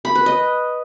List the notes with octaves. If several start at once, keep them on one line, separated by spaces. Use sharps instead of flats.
B5
B4
D#5